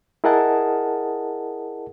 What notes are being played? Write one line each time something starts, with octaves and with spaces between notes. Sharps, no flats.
E4 G#4 A#4 D#5 F#5 A5